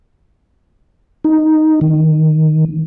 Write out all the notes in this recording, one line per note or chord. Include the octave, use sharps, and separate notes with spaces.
D#4
D#3